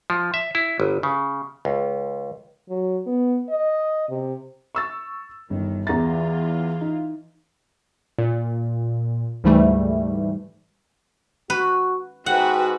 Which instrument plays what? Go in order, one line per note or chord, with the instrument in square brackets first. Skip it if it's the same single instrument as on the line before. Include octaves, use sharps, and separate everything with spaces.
[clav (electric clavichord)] F3
E5
E4
G1
C#3
C#2
[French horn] F#3
B3
D#5
C3
[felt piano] C#6 E6 A6
[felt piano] G1 [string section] D#3
[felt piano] E2 A#5 A6 [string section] E3 F4
[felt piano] D#4
[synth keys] A#2
D2 G#2 E3 G3 A3
[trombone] F#4 [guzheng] B4
[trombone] G#2 [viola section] F#4 B4 [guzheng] F#5 [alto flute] G5